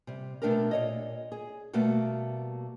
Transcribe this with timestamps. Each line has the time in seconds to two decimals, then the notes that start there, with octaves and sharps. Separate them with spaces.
0.07 C3 G3
0.42 B2 G#3 A3 D4 G4 A#4
0.71 A#2 C#5 D#5
1.32 G#4
1.73 B2 G3 A3 A#3 F#4